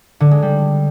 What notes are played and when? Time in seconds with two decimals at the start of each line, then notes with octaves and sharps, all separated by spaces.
0.20 D3
0.31 G#3
0.42 G3